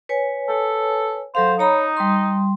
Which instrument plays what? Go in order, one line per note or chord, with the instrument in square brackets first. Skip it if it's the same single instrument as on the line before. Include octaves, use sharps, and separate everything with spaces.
[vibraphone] B4 C#5 G#5
[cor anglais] A4
[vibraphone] F#3 A4 F5 [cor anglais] C5
[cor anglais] D#4 [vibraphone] C#5 A#5 B5
[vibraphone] G3 C6